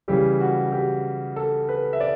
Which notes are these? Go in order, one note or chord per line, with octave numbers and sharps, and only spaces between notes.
C#3 E3 G3 G4
F#4
G4
A4
B4
E5
D5